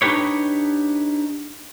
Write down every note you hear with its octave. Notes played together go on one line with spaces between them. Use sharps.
D4 D#4 F4 G4 B4 C#5